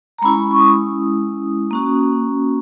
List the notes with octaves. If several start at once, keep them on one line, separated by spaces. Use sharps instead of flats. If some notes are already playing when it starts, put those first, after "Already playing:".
A#5
G#3 C#4 E4 B5
C#6
D#6
A#3 C#4 F#4